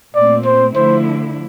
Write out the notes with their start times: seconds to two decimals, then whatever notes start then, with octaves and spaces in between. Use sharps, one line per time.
0.15 A#2 A3 C4 D5
0.45 C5
0.75 D3 F3 A3 E4 C5